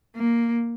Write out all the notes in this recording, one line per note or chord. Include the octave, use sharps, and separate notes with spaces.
A#3